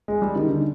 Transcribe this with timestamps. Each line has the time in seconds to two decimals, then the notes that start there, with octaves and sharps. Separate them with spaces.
0.08 G#3
0.22 G3
0.36 D#3
0.48 D3